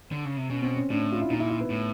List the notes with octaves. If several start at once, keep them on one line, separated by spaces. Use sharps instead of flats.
D3
C#3
C3
B2 C#4
C4
C#4
A2 D4
F4
E4
A#2 D#4
E4
E4
B3
A2